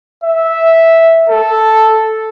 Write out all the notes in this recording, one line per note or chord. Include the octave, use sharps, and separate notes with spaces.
E5
A4